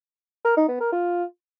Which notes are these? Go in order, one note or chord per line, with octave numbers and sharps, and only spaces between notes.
A#4
D#4
B3
A#4
F4